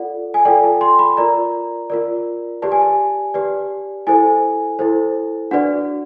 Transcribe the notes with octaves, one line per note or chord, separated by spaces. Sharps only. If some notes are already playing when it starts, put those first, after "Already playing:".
Already playing: F4 A4 D5 F#5
G#5
F4 A4 D5 G5
A5
C6
B5
F4 A#4 D5 A#5
F4 A#4 D5
G4 B4 D5 A5
G#5
A5
G4 B4 D5
E4 A4 C5 G#5
E4 A4 C5
D4 F#4 B4 D5 F#5